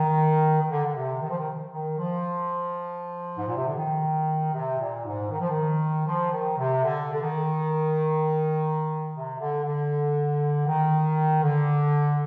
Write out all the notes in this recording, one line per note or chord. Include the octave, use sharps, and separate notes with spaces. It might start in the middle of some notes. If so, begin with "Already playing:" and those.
Already playing: D#3
D#3
D3
D3
C3
D#3
F3
D#3
D#3
F3
G#2
A#2
C3
D3
D#3
C3
A#2
G#2
D#3
F3
D#3
F3
D#3
C3
D3
D3
D#3
C3
D3
D3
D#3
D3